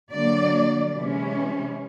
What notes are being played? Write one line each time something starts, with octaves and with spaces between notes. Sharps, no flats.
D3 F#3 A#3 D5
C3 E3 G#3 C#4